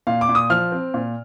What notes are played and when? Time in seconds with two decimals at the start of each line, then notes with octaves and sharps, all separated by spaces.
0.07 A#2 F5
0.21 D6
0.29 A#2
0.35 D#6
0.50 F3 F6
0.72 C4
0.94 A#2